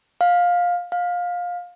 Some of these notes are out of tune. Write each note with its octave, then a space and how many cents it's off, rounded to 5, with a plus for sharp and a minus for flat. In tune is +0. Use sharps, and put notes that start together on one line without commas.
F5 +15
F5 +20